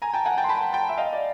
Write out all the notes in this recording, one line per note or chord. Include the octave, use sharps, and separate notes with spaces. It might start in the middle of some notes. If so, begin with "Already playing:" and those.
G#5 A#5
G5 A5
F#5 G#5
G5 A5
C6
A5 B5
G5 A5
E5
D#5 F5
D5